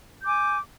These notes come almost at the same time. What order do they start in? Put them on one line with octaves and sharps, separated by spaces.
G6 D6 G#5